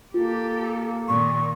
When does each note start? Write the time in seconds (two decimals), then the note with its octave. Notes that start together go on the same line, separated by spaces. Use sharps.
0.14 A#3 F4 G4 A4
1.08 A#2 D#3 C#6